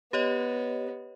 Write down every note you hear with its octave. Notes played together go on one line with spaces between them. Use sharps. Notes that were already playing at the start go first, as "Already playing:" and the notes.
B3 G4 C#5 D#5